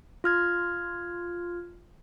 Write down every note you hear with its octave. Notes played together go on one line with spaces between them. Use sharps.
F4 F6 G#6